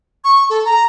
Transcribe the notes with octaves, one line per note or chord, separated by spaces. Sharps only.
C#6
A4
A#5